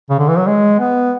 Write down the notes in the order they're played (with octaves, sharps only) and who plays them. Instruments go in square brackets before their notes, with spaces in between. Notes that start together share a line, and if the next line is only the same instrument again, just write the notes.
[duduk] C#3
D3
E3
F#3
G#3
B3